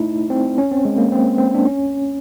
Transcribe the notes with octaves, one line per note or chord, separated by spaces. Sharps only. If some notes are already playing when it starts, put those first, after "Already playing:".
Already playing: A3 D#4 E4
C4
C#4
C4
G#3
A#3
C4
C4
D4
C#4